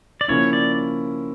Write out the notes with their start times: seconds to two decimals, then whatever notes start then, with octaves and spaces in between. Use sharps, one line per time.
0.21 D5
0.28 C#3 F3 A#3 C#4 E4 C#5
0.53 D5